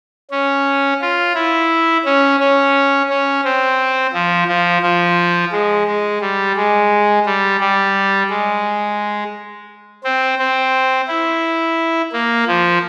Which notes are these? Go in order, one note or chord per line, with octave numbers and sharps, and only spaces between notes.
C#4
F4
E4
C#4
C#4
C#4
C4
F3
F3
F3
G#3
G#3
G3
G#3
G3
G3
G#3
C4
C4
E4
A#3
F3